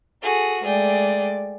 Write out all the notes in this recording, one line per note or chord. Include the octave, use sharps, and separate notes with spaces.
F#4 G#4 A4
G#3 A3 G#4 D5 G5